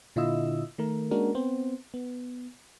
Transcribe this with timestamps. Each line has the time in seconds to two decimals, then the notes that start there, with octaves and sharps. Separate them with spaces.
0.16 A#2 D3 E4 F4 D#5 E6
0.78 D#3 A3 A#4
1.11 G#3 A#3 C#4 D4 F#4 A#4
1.35 B3 C4 C5
1.94 B3